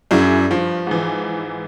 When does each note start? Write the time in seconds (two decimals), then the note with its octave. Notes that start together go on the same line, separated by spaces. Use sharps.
0.11 F#2 D4 E4 G#4
0.51 G2 F3
0.87 G#2 E3